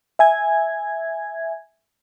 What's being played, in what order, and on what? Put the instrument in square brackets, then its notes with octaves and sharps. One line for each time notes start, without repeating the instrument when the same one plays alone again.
[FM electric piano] E5 G#5 G#6